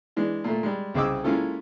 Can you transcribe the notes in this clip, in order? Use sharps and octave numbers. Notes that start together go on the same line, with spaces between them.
E3 G#3 D4
A#2 A3
G3 G#3
C2 C#3 G#4 D#5 D6 E6
G#3 A#3 C#4 E4 F4 A4